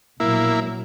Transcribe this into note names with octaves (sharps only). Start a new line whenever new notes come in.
A#1 B2 F#3 A#3 E4